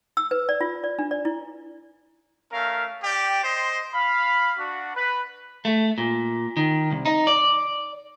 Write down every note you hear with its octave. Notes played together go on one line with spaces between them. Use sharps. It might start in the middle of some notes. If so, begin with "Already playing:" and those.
E6
B4
D5
F4
D5
D4
D5
E4
A3 C#4 A#4 F5
G4 D5 G5
C5 D#5 C6
F5 B5
D4 F#4
B4
A3
A#2
D#3
C2
D#4
D5